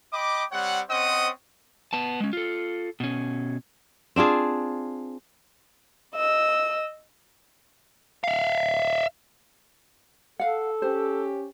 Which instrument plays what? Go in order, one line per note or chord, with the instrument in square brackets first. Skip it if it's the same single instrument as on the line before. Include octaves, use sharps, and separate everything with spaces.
[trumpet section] D#5 G5 B5 D6
G3 C4 C#5 F#5
C4 C#4 C5 D#5 F#5 D#6
[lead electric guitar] B3 A5
G#3 C#4
F4 A4
B2 C#4
[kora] C4 D4 F4 G#4
[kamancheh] D#5 E6
[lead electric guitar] E5 F5
[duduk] A4 [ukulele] F5 F#5
[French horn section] C#4 G4 [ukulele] C5